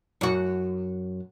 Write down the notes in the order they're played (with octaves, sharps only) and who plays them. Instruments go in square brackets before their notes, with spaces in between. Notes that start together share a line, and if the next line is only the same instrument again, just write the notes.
[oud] F#2 F#4